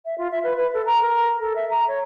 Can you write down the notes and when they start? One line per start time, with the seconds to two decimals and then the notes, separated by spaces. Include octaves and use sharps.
0.05 E5
0.18 F4
0.31 E5
0.43 B4
0.56 B4
0.74 A4
0.86 A#5
1.01 A#4
1.40 A4
1.55 E5
1.70 A#5
1.87 C#5